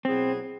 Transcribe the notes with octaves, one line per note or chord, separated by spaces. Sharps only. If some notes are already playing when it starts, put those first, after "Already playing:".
B2 F#3 B3 C4 E4 G#4